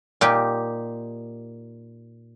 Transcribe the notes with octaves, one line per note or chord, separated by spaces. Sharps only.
A#2 D#4 G4